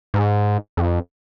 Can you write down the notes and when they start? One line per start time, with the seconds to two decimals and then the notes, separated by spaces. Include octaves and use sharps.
0.14 G#2
0.77 F2